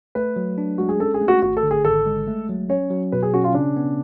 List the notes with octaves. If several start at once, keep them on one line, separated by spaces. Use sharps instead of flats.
A3 B4
F#3
D4
G#3 F#4
G#4
C#4 A4
G#4
A3
F#4
G#1 F#4
A4
D3
G#4
G#1 A4
G#3
A3
F#3
C#4 C#5
F#3
B2 B4
G#4
C#4 F#4
F4
C#3 D4
B3